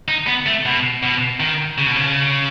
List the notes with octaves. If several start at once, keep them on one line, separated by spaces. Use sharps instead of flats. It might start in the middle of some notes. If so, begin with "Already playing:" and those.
D#4
B3
A3
B2
B2
D#3
C#3
B2
C#3